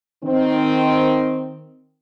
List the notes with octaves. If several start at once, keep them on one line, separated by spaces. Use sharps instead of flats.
D#3 C4